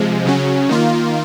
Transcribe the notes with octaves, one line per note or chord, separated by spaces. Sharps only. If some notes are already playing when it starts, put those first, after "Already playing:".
Already playing: C3 F3 G#3
C#3 F#3 C#4
D#3 A#3 F4